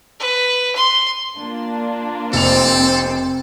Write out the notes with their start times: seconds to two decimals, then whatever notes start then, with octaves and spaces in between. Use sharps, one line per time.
0.20 B4
0.76 C6
1.37 A#3 D4 F4
2.33 F1 C4 A4 F7